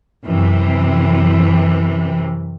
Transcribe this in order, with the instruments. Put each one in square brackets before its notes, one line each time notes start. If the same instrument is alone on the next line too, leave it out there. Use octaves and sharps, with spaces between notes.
[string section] F#2 C3 E3